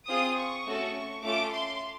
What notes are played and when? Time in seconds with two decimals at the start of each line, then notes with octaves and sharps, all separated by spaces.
0.08 C4 F4 G#4 D#6
0.38 C#6
0.66 A3 C#4 F#4 A4
1.24 A3 C#4 F4 A4 D6
1.53 C6